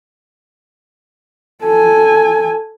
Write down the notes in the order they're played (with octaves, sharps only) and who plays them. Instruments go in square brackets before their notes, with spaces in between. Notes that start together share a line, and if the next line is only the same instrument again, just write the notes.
[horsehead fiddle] A4 G#5